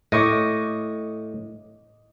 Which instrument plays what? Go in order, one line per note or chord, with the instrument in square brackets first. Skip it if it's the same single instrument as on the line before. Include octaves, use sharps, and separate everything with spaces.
[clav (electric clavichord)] A2 [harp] D#5 C#6 D6